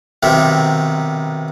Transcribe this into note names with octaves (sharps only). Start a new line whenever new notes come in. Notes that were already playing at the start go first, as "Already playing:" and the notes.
B1 C3 D#3